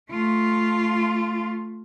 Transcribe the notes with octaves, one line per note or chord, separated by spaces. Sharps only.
A3 F4